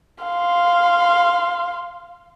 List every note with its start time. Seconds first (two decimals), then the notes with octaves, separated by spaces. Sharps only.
0.24 F5 C6